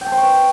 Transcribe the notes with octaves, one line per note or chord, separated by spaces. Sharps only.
G5
A5
C5
C#6
B4